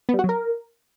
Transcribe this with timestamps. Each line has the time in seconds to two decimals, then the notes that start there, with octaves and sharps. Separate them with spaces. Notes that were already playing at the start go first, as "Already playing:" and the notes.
0.09 B3
0.14 G3
0.19 F#4
0.24 F#3
0.29 A#4